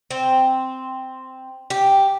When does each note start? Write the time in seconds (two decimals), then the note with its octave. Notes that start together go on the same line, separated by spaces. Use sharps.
0.10 C4
1.70 G4